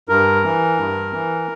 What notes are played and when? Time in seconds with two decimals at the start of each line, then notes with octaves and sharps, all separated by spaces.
0.09 G2 A#4
0.44 E3
0.78 G2
1.13 E3